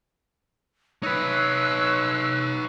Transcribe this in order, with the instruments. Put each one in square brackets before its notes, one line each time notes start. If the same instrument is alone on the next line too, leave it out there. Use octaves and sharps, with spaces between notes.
[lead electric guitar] D#4 B4 [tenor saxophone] C#5 [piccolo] E6 [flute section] F#6